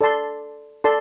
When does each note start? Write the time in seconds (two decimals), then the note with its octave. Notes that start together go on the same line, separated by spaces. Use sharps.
0.01 A4 D5 A5 C6
0.84 A4 D5 A5 C6